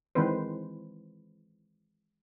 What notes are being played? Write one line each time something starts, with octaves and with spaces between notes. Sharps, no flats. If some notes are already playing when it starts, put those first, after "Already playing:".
D#3 E3 G#3 C4 B4 C5